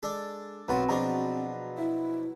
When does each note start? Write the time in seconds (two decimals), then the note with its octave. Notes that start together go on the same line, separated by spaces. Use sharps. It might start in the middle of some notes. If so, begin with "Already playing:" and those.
0.03 G#3 D4 A4
0.68 B1 F#2 F#3 C4 F4 B4
0.89 B2 F3 D4 F#4 G#4 A#5
1.78 E4 E5